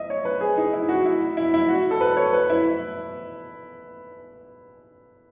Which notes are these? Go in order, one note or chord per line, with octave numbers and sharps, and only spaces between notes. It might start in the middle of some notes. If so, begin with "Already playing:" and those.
Already playing: D#5 E5
C#5
B4
G#4
D#4
E4
F#4
E4
E4
E4
F#4
A4
B4
C#5
B4
E4